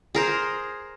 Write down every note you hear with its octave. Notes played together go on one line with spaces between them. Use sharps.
G#4 A#4 C5